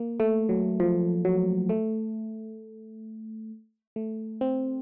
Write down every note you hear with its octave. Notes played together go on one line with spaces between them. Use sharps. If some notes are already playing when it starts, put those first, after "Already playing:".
Already playing: A#3
A3
F#3
F3
F#3
A3
A3
C4